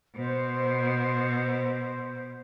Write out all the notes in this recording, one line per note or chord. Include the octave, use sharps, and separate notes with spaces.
B2 C5